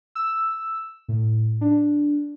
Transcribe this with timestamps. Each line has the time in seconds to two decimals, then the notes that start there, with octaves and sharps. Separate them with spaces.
0.15 E6
1.08 A2
1.61 D4